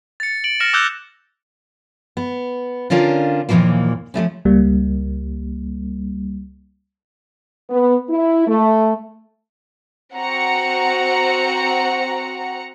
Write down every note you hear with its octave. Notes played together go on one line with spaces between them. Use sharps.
A6 C#7
D7 F#7
F6 A#6 C#7 E7
D6 E6 F#6 G6 G7
B3
D3 C#4 D4 F4 A#4
D#2 A#2 C#3 E3 F3 A#3
F3 G3 A3 C#4
C#2 G3 A#3
B3
E4
A3
C4 F#4 F#5 A#5 C#7